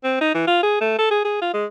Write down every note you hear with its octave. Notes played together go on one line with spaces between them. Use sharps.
C4
D#4
E3
F4
G#4
A3
A4
G#4
G#4
F4
G#3